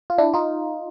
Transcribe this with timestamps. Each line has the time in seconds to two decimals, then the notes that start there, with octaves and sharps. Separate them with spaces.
0.10 F4
0.18 D4 E4
0.34 D#4 F4